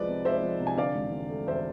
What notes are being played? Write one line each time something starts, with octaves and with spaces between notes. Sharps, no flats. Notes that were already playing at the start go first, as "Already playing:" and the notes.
Already playing: C2 F3 G#3 B4 D5
C3
G#3 C5 E5
F3
C3
G#5
D3 D5 F5
E1
D3
A3
E1 C5 E5